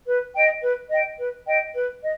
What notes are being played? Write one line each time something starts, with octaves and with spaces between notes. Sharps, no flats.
B4
D#5 G5
B4
D#5 G5
B4
D#5 G5
B4
D#5